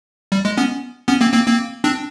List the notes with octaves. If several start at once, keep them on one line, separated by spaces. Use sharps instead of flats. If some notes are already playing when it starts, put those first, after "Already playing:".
G3
G#3
B3 C#4
B3 C#4
A#3 C4
A#3 C4
A#3 C4
C4 D4